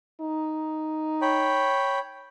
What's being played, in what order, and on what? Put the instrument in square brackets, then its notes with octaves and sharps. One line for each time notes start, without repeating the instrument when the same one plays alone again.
[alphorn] D#4
[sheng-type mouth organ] C#5 G5 B5